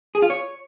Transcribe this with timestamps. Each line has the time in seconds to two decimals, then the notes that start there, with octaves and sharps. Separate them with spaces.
0.15 G#4
0.22 F4
0.30 C#5